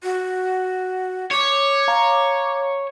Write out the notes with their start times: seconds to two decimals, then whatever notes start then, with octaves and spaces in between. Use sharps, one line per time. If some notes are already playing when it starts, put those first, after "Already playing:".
0.03 F#4
1.31 C#5 D6
1.88 F5 A#5